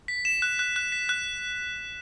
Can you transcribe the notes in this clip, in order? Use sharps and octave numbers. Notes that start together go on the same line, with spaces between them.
B6
E7
F#6
F#6
F#6
B6
F#6